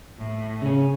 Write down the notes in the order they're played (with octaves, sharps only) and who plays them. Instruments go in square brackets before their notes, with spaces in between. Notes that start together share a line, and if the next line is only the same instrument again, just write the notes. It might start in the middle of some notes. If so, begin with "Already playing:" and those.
[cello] A2
[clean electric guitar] C#3 C#4